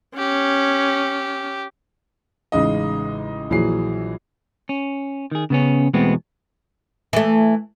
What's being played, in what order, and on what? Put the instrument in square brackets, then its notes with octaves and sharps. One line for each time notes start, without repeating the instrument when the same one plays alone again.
[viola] C#4 [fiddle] G4
[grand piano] A1 C#3 G#3 D#4 D#5
A#1 E3 F#3 G#4 C7
[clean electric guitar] C#4
D#3 G#4
C#3 B3 C#4
E2 B2 G#3 A3 B3 C4
[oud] E3 A3